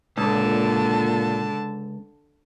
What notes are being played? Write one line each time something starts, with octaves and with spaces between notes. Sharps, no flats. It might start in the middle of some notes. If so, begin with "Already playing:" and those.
C#2 A#2 D3 A5